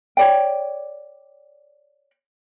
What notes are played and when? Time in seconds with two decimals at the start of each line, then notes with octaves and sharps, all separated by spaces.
0.17 C#5 D5 G5